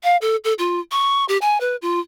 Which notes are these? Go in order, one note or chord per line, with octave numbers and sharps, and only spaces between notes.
F5
A4
A4
F4
C#6
G4
G#5
B4
F4